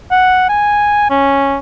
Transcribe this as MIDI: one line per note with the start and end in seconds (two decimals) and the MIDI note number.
0.11 0.44 78
0.49 1.07 80
1.10 1.57 61